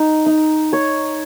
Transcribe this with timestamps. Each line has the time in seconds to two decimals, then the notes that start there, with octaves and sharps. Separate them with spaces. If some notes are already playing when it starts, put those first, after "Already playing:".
Already playing: D#4
0.26 D#4
0.73 C#5